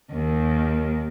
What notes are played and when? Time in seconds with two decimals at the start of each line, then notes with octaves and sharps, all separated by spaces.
0.12 D#2 D#3